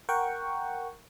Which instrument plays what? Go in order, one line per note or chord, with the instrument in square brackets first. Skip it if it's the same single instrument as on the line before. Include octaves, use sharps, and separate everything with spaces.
[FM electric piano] A#4 F#5 G5 C#6